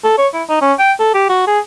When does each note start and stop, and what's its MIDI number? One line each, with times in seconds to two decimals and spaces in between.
0.04 0.13 69
0.18 0.28 73
0.34 0.43 64
0.49 0.58 63
0.61 0.73 61
0.79 0.92 79
1.00 1.12 69
1.14 1.25 67
1.29 1.47 66
1.47 1.59 68